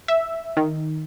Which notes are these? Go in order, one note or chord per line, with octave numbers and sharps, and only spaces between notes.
E5
D#3